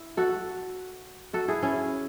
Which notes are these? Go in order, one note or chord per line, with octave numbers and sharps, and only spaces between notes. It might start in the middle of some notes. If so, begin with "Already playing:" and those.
Already playing: E4
F#4 A4
F#4 A4
E4 G#4
C#4 E4